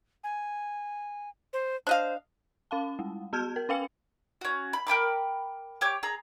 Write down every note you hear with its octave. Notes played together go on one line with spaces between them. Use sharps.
G#5
C5
D4 C5 D#5 F5
C#4 F5 A5
G3 G#3
B3 F#4 A5 F6 G6 G#6
A#4
C#4 B4 F5 G5 G#5 C#7
C#4 F#4
B5
A#4 G5 B5 D6
G4 C#5 D6
G#4 A#5